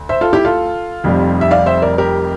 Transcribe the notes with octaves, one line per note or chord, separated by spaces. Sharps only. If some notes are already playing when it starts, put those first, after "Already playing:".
Already playing: D2
C5 E5
F4 A4
E4 G4
F4 A4
F1 F2 C3 G3
E5
D5 F5
C5 E5
A#4 D5
G4 A#4